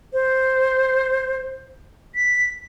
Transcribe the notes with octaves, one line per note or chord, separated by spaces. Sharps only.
C5
B6